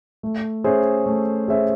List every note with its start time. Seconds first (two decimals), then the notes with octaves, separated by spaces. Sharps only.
0.23 A3
0.64 C#4 G#4 C5 E5
1.06 A3
1.48 C#4 G#4 C5 E5